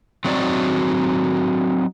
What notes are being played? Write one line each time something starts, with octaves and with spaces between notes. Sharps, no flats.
F#3 C4 D#4 F#4 D5